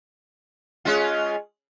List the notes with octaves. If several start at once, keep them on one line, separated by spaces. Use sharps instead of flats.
G#3 C#4 F4